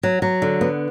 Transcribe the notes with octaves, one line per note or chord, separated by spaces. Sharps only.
F#3
F#3
D3
B3